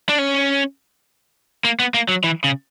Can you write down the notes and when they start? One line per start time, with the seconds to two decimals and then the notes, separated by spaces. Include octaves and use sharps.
0.09 D4
0.18 C#4
1.64 A#3
1.80 B3
1.94 A#3
2.09 F#3
2.24 E3
2.44 C#3